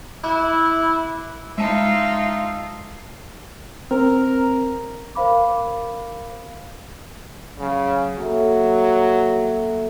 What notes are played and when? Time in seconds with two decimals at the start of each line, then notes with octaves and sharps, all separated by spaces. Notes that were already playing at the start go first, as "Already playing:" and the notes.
0.24 E4 B5 D6 F#6
1.58 G#3 D#4 F4 E5 A5
3.91 C4 A#4
5.15 A#4 C5 F5 B5 D6
7.59 C#3 F#3
8.18 F#3 A#3 A4 E5